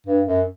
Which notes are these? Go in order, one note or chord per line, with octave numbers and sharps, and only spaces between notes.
G2
F#2